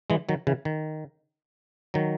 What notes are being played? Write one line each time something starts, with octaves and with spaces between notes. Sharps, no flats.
E3 G#3
D#3 F#3
C#3 E3
D#3
D#3 F#3